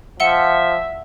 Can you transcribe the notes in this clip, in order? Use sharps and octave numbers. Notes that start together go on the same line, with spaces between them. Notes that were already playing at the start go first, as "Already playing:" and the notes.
F3 E5 F#5 C#7 G7